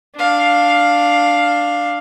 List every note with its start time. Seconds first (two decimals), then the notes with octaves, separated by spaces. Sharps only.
0.16 D4 F5